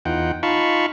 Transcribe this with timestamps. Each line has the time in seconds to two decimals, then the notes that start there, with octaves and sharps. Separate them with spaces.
0.05 E2 D#4 F4 F#5 G5
0.43 D#4 F4 F5 A5 B5 C#6